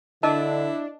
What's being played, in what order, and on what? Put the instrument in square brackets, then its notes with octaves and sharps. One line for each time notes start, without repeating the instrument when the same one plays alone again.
[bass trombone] D3 [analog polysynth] D4 [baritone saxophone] E4 [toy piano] A#4 D#5 A5